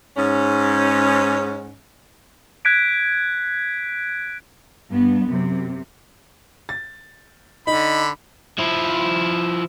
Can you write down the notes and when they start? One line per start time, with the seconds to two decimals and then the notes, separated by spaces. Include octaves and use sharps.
0.17 G#2 C#4
2.65 F#6 G#6 B6 D7
4.89 G2 B3
5.26 F#2 C3
6.69 A6
7.67 D3 D#4 B5
8.58 F3 E4